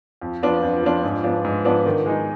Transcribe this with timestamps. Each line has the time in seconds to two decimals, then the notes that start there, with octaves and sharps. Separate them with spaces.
0.22 F2
0.43 F3 B3 D4 F4
0.63 F2
0.83 F3 B3 D4 F4
1.03 G#2
1.24 F3 B3 D4
1.45 G#2
1.65 F3 B3 D4
1.85 D#3
2.06 G#3 D#4